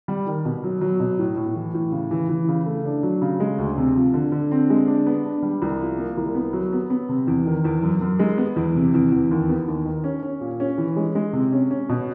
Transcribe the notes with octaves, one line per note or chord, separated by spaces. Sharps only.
G3
D#3
B2
F#3
F#3
B2
A2
A2
E3
A2
C#3
E3
E3
C#3
A3
D4
F#3
C#3
G#3
D2
C3
F3
D3
D3
C4
G#3
D4
B3
D4
G3
C2
F3
A#3
C2
B3
F#3
B3
B3
C3
E2
D#3
E2
F#2
F#2
G#3
B3
E2
C3
E2
E2
D#2
B3
D#2
D#3
C#4
C#4
A#2
C#4
E3
G#3
G#3
C3
C#4
C#4
B2